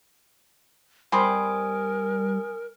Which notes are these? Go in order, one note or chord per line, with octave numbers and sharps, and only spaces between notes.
G3 C4 A#4 G#5 B5 C6 D#6